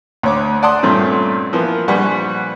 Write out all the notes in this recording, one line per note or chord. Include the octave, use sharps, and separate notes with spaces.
D2 C#5 D6
D5 F#5 A5 C6 D#6
G2 A#2 A3 C4 C#4
E3 F3 A#3 B3
A#1 G3 B4 F#5 G#5 C#6